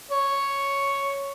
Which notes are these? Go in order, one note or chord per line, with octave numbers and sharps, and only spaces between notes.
C#5